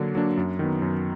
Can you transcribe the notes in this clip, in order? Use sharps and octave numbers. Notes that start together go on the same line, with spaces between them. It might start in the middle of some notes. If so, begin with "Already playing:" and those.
Already playing: D3 F#3 A#3 D4
F#3 A#3 D4
F#2
D#3 F#3 B3
F#2